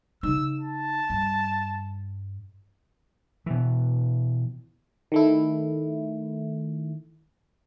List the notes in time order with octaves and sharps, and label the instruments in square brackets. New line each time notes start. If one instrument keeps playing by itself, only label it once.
[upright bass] C#3 D#4 [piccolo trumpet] E6
[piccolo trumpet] A5
[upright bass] G2
[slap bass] B2 E3
[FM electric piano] D#3 A3 E4